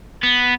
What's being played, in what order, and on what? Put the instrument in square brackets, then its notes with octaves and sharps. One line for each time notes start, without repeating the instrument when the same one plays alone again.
[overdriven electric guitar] B3